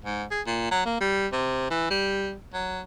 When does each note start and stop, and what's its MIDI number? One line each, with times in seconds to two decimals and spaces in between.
0.04 0.25 44
0.31 0.42 68
0.47 0.67 46
0.71 0.85 54
0.85 0.98 58
1.01 1.27 55
1.32 1.69 48
1.70 1.88 52
1.90 2.36 55
2.54 2.81 54